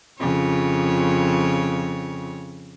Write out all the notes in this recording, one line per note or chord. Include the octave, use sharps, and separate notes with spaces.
F2 C#3 C#5